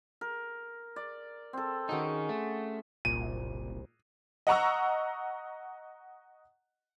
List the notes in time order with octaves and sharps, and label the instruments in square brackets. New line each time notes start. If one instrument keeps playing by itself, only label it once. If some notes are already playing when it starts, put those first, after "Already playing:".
[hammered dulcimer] A#4
D5
C4 A4
[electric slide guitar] D#3 D#4 [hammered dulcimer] C#4 F#4 G#4
[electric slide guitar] A3
[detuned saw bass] F#1 [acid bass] C2 [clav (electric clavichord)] A#2 [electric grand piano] D#7
[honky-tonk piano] D#5 F#5 A#5 C#6 E6